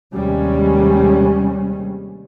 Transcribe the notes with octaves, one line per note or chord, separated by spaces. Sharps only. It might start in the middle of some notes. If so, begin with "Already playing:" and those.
D#2 C3 G3 G#3 C#4